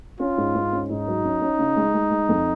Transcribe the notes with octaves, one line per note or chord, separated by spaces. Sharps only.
C#4 F4
G#2
G#2
C#4
G#2 D#4
F#3
C#4
C#4
C#3
G#3
G#3
G#3
F2